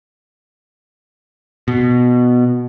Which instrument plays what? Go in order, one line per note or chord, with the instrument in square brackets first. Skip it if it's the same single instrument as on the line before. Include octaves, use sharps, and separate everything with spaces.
[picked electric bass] B2